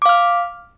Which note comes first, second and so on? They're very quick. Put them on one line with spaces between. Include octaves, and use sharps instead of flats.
D6 F5 F6